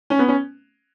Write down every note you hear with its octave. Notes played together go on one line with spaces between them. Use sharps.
C#4
B3
C#4